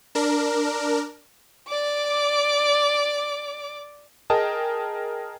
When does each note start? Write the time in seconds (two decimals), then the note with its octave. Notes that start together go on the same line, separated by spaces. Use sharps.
0.15 D4 A#4
1.69 D5 D6
4.30 G#4 A#4 D#5 G5 A5